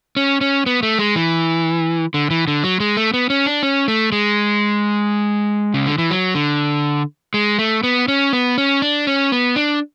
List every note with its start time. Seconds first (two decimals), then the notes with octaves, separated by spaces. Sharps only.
0.17 C#4
0.41 C#4
0.66 B3
0.83 A3
0.99 G#3
1.16 E3
2.14 D3
2.31 E3
2.47 D3
2.64 F#3
2.80 G#3
2.97 A3
3.14 B3
3.30 C#4
3.46 D4
3.63 C#4
3.88 A3
4.12 G#3
5.74 C#3
5.86 D3
5.98 E3
6.11 F#3
6.35 D3
7.34 G#3
7.59 A3
7.83 B3
8.08 C#4
8.33 B3
8.58 C#4
8.82 D4
9.07 C#4
9.32 B3
9.56 D4